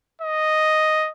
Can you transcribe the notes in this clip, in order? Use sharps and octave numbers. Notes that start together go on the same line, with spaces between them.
D#5